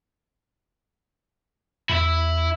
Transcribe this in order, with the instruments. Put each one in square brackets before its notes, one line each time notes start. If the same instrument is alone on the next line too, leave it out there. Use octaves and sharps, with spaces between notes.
[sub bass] E2 [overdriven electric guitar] E4 E5